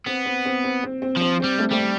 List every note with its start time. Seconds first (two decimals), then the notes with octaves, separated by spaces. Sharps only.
0.06 B3 C4
0.25 C4
0.45 C4
0.64 C4
0.84 C4
1.02 C4
1.16 F3 C4
1.40 G3 C4
1.59 A3 C4
1.71 G3 A3 C4